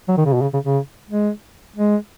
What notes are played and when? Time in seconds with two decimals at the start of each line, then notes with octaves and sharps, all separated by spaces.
0.08 F#3
0.17 D#3
0.25 C#3
0.34 B2
0.42 C#3
0.54 C#3
0.65 C#3
1.10 G#3
1.76 G#3